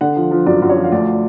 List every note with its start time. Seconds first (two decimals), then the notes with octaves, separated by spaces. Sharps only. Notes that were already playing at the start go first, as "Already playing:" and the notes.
0.01 D3 F#5
0.16 F3
0.31 F3
0.46 F#2 D5
0.62 F#2
0.69 C#5
0.76 F3
0.84 F5
0.92 D2 D5